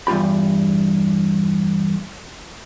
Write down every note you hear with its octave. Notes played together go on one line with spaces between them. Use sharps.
E2 G2 F4 G4 B5